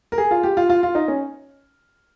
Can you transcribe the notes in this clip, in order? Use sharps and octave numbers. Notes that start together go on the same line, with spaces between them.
A#4
G#4
F4
G4
F4
F4
F4
D#4
C#4